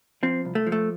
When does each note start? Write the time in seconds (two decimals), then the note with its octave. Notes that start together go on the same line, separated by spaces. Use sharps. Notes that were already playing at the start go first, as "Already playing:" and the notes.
0.23 F3 C4
0.45 C2
0.55 A3
0.67 F3
0.72 A3